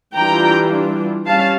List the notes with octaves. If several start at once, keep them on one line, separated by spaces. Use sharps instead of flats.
E3 G3 D4 F4 G5 A#5
G3 C#4 F5 A5